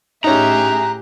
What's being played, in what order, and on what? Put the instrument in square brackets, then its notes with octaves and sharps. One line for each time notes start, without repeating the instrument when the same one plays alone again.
[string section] A2 G#4 E5 [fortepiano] C#4 D#4 [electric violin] G4 F#6 [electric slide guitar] A#5